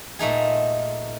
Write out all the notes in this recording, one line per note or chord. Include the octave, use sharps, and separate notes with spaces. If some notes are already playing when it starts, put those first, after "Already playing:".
A#2 A3 D#4 G#4